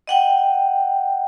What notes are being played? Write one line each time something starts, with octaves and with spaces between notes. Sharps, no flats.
D#5 F#5 G5